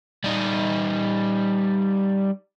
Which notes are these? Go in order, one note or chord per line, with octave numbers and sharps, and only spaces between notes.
G3 D#4